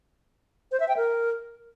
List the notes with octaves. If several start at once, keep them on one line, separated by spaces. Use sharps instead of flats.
C5
E5
G5
A#4